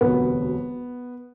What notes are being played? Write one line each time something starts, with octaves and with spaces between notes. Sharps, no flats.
E1 D2 C3 F#3 B3